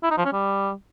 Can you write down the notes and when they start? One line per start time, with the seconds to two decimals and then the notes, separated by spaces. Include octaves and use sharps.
0.03 E4
0.11 D#4
0.18 F3
0.25 C#4
0.33 G3